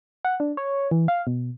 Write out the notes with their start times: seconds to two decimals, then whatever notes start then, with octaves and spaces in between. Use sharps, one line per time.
0.25 F#5
0.40 D4
0.57 C#5
0.91 E3
1.08 F5
1.27 B2